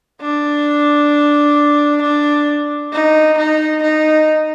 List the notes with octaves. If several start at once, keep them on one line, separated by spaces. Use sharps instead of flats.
D4
D4
D#4
D#4
D#4